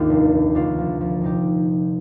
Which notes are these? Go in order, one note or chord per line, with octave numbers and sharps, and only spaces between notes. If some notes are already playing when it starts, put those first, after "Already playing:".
Already playing: G#1 D#2 D4 F4 G4
F1
D#3
D2 D4 F4
F3
F3
C3 D#4 G4